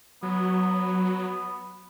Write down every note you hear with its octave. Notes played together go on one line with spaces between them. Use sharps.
F#3 B3